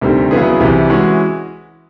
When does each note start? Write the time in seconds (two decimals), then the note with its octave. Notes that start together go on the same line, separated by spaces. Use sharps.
0.01 D2 C3 D#3 G3 C4
0.31 C#3 F#3 B3 E4 G#4
0.60 C2 C3 E3
0.90 E3 G#3 C#4 F#4